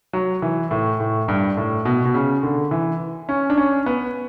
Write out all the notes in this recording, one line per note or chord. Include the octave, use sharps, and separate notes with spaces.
F#3
E3
A2
A2
G2
A2
B2
B2
C#3
D3
E3
C#4
D4
C#4
B3